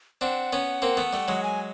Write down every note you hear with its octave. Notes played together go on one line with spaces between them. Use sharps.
C4 D4 F#5
B3 C#4
A#3 C4
A3 B3
G3 A3
F#3 G#3
G#5